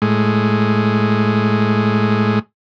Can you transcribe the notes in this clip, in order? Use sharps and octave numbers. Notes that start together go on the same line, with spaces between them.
A2 G#3